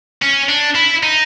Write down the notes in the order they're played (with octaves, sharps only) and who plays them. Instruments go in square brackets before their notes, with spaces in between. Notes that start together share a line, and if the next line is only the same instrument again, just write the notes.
[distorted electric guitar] C#4
D4
E4
D#4